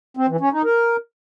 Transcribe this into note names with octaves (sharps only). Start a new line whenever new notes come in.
C4
E3
C#4
D#4
A#4